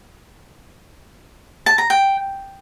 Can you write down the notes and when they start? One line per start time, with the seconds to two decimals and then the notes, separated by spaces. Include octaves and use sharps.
1.66 A5
1.78 A#5
1.90 G5